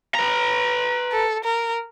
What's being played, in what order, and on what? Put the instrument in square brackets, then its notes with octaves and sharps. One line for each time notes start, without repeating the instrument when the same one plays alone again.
[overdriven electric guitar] B4 A#5
[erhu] A4
A#4